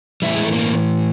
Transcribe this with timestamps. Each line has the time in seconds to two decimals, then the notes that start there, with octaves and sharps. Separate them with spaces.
0.22 A2 E3 G3 E4
0.35 G#3
0.44 A3
0.53 A#3